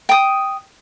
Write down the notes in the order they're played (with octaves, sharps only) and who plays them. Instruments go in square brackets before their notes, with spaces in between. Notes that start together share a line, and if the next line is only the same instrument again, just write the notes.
[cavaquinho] G5 D#6